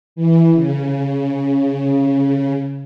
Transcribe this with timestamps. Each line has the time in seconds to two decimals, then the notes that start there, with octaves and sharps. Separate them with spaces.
0.16 E3
0.53 C#3